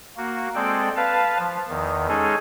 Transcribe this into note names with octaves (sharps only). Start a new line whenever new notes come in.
A#3 F#4
G#3 C4 A4 D5 G5
B4 F5 A5
F3
E2 D#3
G#3 C#4 D#4 G#4 A4